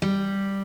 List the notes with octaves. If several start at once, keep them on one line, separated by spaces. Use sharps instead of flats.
G3